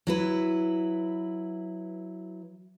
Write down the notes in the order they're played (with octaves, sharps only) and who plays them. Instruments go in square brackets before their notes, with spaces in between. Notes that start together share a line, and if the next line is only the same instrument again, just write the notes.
[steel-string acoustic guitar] F#3 E4 B4